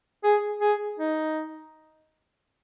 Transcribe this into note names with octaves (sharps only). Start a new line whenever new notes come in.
G#4
G#4
D#4